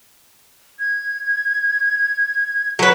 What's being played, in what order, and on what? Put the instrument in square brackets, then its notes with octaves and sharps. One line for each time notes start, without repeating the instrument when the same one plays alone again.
[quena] G#6
[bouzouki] F#3 B4 [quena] F#5